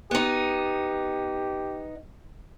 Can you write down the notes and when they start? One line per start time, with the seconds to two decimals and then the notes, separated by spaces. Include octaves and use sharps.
0.11 B3 D#4 G4